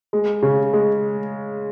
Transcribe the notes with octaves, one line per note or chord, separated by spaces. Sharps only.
G#3
C#3
G#3